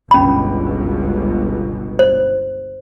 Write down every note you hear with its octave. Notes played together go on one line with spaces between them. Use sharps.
G1 C#2 B2 C#4 B5
C5